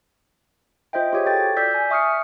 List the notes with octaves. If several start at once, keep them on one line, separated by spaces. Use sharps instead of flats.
F4 C5 D#5 E5 G5
F4 G4 G#4 C#5
F#4 A4 G5 A6
D5 E6 G6 B6
G#5
E5 C#6 D#6 F6 C7 C#7